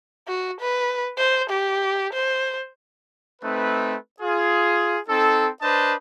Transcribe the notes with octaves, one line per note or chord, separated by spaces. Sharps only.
F#4
B4
C5
G4
C5
A3 C4 D#4 B4
F4 G#4
C4 D#4 A4
D4 B4 C5 D#5 A5